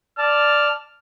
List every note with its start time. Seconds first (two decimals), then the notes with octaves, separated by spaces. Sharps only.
0.18 D5 A5 F6